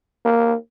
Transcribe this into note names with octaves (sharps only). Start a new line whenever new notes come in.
A#3